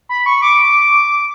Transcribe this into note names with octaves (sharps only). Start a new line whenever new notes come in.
B5
C#6
D6